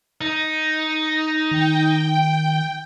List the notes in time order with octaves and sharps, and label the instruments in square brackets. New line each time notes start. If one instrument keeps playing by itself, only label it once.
[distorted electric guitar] D#4
[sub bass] D#3 [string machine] G5